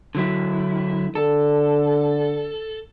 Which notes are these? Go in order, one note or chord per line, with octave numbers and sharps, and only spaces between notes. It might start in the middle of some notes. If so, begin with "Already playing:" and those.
D3 F#3 E4
D3 A4